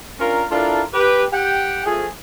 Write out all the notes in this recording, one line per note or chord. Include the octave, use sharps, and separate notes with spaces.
C#4 D4 F4 A#4
D4 E4 F4 A4 A#4 D5
G4 B4
G4 F#5 G5
F3 A3 G#4